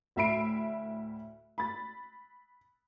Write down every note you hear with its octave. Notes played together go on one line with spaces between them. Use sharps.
D2 A2 E5 B5 C7 D7
B5 A6